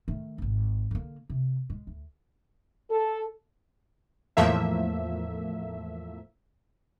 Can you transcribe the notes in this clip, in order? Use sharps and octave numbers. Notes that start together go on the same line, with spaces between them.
D#3 A3
D#1 G#1
D3 A#3
C3
G#3
D2
A4
E2 A2 F3 A3 A#3 E5